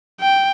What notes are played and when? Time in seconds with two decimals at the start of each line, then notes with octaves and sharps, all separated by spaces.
0.21 G5